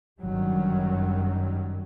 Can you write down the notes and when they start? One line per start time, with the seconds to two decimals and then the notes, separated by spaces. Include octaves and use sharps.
0.21 G1 F#2 D#3 F#3 G3